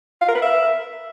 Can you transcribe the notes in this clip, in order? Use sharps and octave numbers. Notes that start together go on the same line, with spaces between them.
F5
A#4
B4
E5